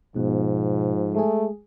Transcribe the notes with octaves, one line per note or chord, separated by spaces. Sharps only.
G#2 B2 F3
G#3 A3 G#4